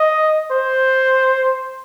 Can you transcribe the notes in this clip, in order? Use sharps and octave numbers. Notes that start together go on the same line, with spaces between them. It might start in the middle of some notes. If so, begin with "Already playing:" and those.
Already playing: D#5
C5